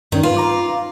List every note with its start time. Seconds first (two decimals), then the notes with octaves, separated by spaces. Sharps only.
0.12 G2 D#3 C#4
0.23 F4 B4 F5
0.37 A#5 D6